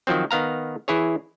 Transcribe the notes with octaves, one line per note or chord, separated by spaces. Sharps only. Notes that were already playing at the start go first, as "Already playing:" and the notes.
D#3 F3 F#3 C4
D#3 B3 F5 A#5
E3 E4 G#4 C#5